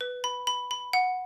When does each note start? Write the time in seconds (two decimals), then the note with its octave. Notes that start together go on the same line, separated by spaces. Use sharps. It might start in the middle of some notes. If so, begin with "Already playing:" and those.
0.01 B4
0.24 B5
0.47 B5
0.71 B5
0.93 F#5